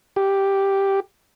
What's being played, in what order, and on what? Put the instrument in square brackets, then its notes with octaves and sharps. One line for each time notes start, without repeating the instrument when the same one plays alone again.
[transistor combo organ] G4